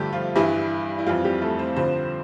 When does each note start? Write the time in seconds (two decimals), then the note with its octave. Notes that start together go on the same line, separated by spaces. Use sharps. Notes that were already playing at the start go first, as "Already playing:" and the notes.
Already playing: G2 D3 F3 G3 A3 G4 A4
0.13 F3 F4
0.35 G2 E3 G3 E4
0.98 E4
1.06 F2 E3 F3 G3 F4
1.24 G3 G4
1.41 A3 A4
1.59 C4 C5
1.76 G2 D3 F3 C4 C5